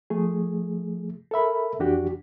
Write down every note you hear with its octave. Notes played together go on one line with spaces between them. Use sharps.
F3 A3 G#4
A4 A#4 E5 B5
F2 E3 D4 F#4 G4